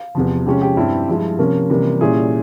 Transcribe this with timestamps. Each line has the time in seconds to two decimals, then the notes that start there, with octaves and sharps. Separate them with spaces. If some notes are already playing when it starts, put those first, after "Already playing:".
Already playing: F5
0.15 E2 C3 F3
0.46 C3 F3 G#3 C#4 G4
0.61 G4
0.77 G2 G3 C4 E4
1.08 G2 F3 G#3 E4
1.39 C3 F3 A#3 C#4 A#4
1.70 C3 E3 G3 A#3 C#4
2.01 A#2 G3 C#4 E4 G#4